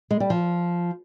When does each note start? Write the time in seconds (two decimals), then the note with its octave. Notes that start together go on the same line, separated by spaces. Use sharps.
0.11 G#3
0.20 G3
0.30 F3